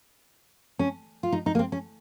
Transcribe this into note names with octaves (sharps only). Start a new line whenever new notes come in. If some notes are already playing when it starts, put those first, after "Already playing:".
C#4
F4
D#4
D#4
A#3
C4
C#4